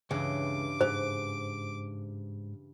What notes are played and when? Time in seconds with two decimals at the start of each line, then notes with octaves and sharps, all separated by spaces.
0.11 C#2 G2 C#3 E3 D6
0.81 G#2 C5